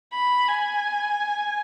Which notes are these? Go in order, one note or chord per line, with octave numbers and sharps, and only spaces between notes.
B5
G#5